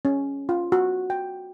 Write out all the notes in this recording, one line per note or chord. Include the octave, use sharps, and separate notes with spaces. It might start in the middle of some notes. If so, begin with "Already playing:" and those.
C#4
F4
F#4
G5